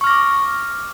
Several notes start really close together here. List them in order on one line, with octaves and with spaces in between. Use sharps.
C#6 F6 A#6 D6